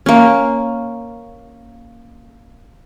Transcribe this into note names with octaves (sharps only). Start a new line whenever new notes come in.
A#3 C#4